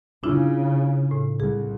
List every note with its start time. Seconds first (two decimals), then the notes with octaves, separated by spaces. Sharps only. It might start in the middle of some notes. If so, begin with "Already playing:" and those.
0.24 C#3 D4 E4 F4
1.11 A2
1.40 C2 G#4